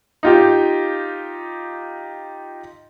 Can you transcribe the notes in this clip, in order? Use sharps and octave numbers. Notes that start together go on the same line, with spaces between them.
D#4 F4 G4